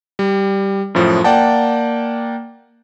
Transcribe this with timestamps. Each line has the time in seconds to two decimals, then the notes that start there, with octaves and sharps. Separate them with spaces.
0.19 G3
0.95 F#2 A2 F3
1.24 A#3 D5 F#5 G5 A5